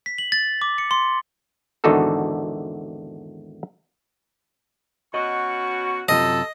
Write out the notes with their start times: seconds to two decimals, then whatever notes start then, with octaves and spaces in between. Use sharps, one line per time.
0.06 B6
0.18 F#7
0.32 A6
0.62 D6
0.78 C#7
0.91 C6
1.84 G#1 E2 D3 D#4 F#4 A4
5.14 B2 C#4 F#4 D#5 C#6
6.09 F#2 C3 F4 A4 D#5